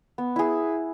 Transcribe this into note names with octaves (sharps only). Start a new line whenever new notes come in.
B3
E4 G#4